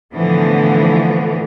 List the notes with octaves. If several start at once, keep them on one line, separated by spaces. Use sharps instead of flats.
A2 D3 E3 F3 B3